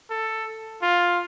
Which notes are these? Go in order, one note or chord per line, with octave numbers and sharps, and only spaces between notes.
A4
F4